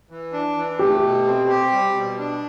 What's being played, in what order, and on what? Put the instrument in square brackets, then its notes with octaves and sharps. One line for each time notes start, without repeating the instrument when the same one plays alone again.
[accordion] E3
D4
E3
[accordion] A3 [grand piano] G4
[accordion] B2
C4
G4
G3
B2
D4